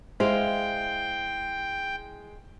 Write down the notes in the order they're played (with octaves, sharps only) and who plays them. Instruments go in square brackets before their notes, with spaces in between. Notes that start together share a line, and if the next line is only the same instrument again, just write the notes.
[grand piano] G#3 [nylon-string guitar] E4 C5 F5 [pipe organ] G5